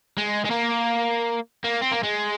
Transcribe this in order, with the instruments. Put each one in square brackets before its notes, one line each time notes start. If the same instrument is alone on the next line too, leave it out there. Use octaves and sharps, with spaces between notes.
[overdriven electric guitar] G#3
G#3
A#3
A#3
C4
A#3
G#3